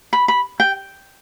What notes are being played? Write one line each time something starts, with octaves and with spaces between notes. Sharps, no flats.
B5
B5
G5